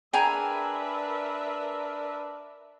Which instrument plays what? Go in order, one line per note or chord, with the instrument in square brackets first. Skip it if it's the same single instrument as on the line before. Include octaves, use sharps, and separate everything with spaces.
[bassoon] D4 [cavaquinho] G#4 [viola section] A#4 B4 E5 [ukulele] G5 G#5 A#5